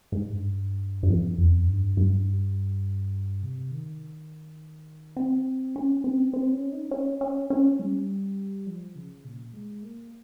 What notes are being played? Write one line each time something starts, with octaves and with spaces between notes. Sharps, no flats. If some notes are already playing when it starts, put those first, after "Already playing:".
G#2
G2
G2
F2
F2
G2
G2
C3
D#3
C4
C#4
C4
C4
C#4
D#4
C#4
C#4
C#4
G3
F3
C#3
A#2
G#3
A#3